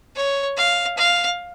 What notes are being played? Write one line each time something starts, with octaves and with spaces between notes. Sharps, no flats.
C#5
F5
F5